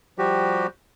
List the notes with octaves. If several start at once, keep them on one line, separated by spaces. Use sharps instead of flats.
F3 G3 F#4 G4